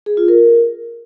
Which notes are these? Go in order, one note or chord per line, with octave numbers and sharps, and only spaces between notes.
G#4
F4
A#4